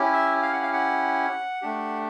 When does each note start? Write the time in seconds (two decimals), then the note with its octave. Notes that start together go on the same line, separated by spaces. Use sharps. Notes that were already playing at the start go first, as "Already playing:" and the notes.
Already playing: C#4 E4 G4
0.13 E5
0.42 F5
0.53 F#5
0.63 F5
0.73 F#5
1.62 A3 D4 G4